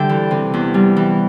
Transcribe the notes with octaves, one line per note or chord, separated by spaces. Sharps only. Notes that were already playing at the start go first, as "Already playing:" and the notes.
Already playing: D3 G3 C5 D5 E5 G5
E3
C3
E2
G3
E3